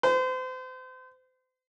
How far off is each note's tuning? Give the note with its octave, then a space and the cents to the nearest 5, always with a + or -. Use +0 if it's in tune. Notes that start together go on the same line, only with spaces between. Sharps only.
C5 -35